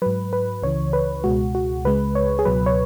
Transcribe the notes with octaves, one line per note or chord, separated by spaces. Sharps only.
G#2 F#3 B4
B4
C#2 C#3 E3 C#5
B4
C#2 B2 G#3 F#4
F#4
C#2 C#3 G#3 B4
C#5
G#4
C#2 B2 F#3 B4
C#5